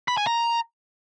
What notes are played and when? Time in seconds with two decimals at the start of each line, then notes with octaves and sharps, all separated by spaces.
0.08 B5
0.17 G#5
0.27 A#5